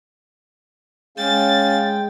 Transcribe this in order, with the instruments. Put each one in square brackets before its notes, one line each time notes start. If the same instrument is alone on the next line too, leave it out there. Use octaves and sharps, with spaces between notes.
[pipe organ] G#3 G5 [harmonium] C#4 F5 [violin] A6